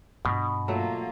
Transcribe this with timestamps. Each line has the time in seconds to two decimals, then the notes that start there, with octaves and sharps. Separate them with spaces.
0.25 G2 B2
0.68 F#3 A3 A#3 F4